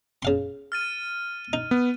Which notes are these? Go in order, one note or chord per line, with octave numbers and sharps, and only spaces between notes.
C#3 F5 C6
F6 A6 D#7
D#4
B3